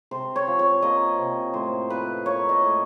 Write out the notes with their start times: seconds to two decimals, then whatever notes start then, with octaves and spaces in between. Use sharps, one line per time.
0.11 C3 C5
0.36 C#5
0.47 F3
0.59 C#5
0.82 A#3 D#5
1.18 C3
1.54 A2 C5
1.90 F3 B4
2.26 A#3 C#5
2.49 D#5
2.61 A2